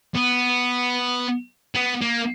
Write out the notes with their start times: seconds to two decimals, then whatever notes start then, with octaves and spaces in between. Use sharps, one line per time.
0.16 B3
1.75 B3
2.01 A#3